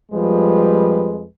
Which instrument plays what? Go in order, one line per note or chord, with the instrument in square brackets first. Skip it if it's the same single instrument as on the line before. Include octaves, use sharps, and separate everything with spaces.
[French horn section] F2 F3 G3 G#3 B4